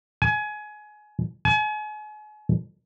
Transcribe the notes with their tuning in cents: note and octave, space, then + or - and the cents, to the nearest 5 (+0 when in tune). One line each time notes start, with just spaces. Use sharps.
G#5 +25
G#5 +40